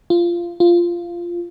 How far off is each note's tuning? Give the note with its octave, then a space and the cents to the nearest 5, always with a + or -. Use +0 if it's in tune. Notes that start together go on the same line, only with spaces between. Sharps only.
F4 -15
F4 -10